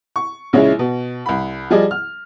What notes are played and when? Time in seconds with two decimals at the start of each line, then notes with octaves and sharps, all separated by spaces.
0.16 C#6
0.53 A#1 C#3 G#3 E4 C#5
0.79 B2
1.26 C2 B5
1.71 F3 G3 G#4 D5 D#5
1.91 F6